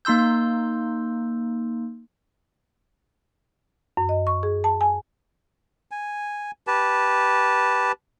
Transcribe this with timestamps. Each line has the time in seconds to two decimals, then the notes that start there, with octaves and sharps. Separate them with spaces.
0.05 A#3 D#4 C6 E6 G6
3.97 F#2
4.09 D#5
4.27 C#6
4.43 G#4
4.64 A5
4.81 G#5
5.91 G#5
6.67 G4 B4 A5